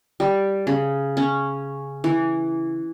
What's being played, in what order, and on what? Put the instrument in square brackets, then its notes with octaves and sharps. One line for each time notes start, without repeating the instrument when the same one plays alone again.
[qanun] G3
C#3
C#4
E3